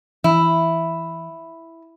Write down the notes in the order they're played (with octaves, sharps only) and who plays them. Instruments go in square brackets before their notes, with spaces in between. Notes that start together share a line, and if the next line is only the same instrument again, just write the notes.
[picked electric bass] E3 [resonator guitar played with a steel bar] E4